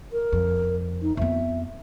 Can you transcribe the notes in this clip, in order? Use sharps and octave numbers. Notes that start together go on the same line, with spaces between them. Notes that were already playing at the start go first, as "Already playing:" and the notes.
A#4
F2
D#4
F2 B3 E5